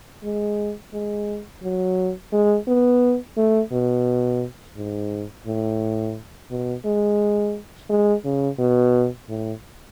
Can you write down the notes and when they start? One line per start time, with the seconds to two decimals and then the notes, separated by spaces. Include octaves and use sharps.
0.24 G#3
0.94 G#3
1.63 F#3
2.33 G#3
2.68 B3
3.37 A3
3.72 B2
4.76 G#2
5.46 A2
6.50 B2
6.85 G#3
7.89 G#3
8.25 C#3
8.59 B2
9.29 A2